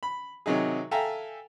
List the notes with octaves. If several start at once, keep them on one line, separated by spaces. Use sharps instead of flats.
B5
C3 D#3 F#3 D#4 G#4
A4 E5 F5 G5 G#5 A#5